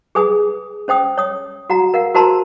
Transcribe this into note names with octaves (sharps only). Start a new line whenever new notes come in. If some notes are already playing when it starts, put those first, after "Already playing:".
G#4 B4 G#5 D#6
C#4 C5 G5 D#6
C#5 D#6
F#4 F#5 A#5
A#4 F5 F#5
F#4 A#4 C5 A5 A#5 C6